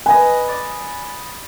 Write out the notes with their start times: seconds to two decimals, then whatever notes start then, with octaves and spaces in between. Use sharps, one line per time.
0.06 B4 D#5 G#5
0.48 D5